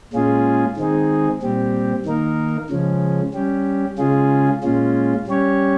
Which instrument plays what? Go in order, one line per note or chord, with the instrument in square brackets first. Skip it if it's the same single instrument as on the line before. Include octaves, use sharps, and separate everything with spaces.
[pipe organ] A#2 G#3 C#4 F4 G#4
D#3 G#3 C4 D#4 G#4
A#2 G3 C4 G4
D#3 A#3 D#4 A#4
C#3 F3 G#3 C#4
G3 C#4 G4
C#3 G#3 C#4 F4 G#4
A#2 G#3 C#4 F4
G3 C#4 G4 C#5